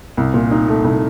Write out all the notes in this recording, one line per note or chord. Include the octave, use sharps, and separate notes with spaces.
C2
A#2
D#4
A3
C2